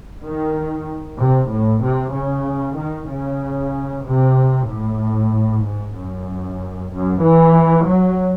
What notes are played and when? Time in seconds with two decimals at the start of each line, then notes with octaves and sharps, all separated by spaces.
0.24 D#3
1.19 C3
1.51 A2
1.84 C3
2.14 C#3
2.78 D#3
3.10 C#3
4.05 C3
4.69 A2
5.64 G#2
5.96 F#2
6.92 F#2
7.23 E3
7.87 F#3